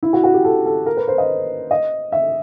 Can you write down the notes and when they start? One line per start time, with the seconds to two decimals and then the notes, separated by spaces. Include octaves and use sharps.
0.03 E4
0.13 F#4
0.24 F#4
0.34 G4
0.45 A4
0.66 A4
0.86 A#4
0.97 B4
1.08 C5
1.18 D#5
1.71 D#5
2.12 E5